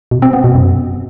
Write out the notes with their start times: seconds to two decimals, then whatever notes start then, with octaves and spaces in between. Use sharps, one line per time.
0.11 B2
0.22 C4
0.33 B3
0.44 B2
0.55 F#2